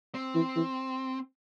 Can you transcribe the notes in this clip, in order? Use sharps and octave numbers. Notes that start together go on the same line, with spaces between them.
C4
E3
E3